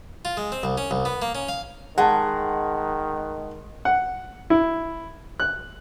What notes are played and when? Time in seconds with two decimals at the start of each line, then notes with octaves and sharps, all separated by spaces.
0.25 F4
0.37 G#3
0.52 C4
0.63 C2
0.78 C#4
0.91 C2
1.05 B3
1.22 A#3
1.35 C#4
1.48 F5
1.98 D#3 G#3 F#5 A5
3.85 F#5
4.50 E4
5.40 F#6